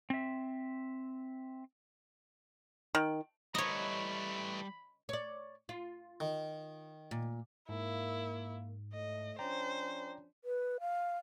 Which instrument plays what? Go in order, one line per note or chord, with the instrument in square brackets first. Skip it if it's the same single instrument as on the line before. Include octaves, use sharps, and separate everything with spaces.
[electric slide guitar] C4 E5
[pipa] D#3
[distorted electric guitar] E3 A3 [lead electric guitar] G3 A#5 [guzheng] C#5 D#5 [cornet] B5
[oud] C#5 D5
F4
[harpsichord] D#3
[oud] A#2
[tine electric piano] G#2 [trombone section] A#3 [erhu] E4
[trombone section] A2 A3 [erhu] D#5
[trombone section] F3 C#4 D4 [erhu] C5 [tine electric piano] D5 G5 A#5
[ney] B4
F5